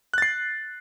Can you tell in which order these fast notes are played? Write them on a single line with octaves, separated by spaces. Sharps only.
F#6 A6 C7